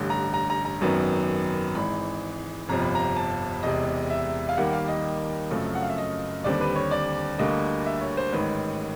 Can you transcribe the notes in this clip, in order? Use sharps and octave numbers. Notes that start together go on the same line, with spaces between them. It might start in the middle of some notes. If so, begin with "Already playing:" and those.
Already playing: A1 G2 D3
A#5
A#5
A#5
A#5
G#1 F#2 D#3 F#3 B3
G#1 G#2 E3 B5
G1 F2 C3 F3 A#5
B5
A#5
A5
E1 E2 C3 D#5
E5
F5
D#2 D#3 G3 A#3 F#5
F5
D#5
F#2 C#3 F3 A3 C4
F#5
F5
E5
D#5
D#2 D3 G3 C4 D5
B4
C#5
D5
D2 D3 G3 A#3 D#5
E5
C#5
C5
A1 G#2 D#3 B4